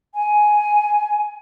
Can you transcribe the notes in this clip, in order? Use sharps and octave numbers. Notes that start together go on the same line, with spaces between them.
G#5